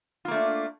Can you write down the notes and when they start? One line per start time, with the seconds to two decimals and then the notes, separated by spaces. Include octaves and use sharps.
0.25 F4
0.28 A#3
0.31 A3
0.35 D4